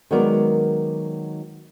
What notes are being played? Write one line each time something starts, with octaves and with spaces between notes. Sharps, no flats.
D#3 F#3 G#3 B3 A#4 D5